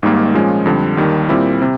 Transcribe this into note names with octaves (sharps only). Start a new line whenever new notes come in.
G#1 G#2 D#3 G3 A#3
A#2 F3 G#3 C#4
F2 D3 G3
D#2 D#3 G3
A#2 G3 C4 E4
C3